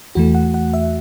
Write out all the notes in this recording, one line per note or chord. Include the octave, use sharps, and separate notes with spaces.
E2 E3 A3 F#4
F#5
F#5
E5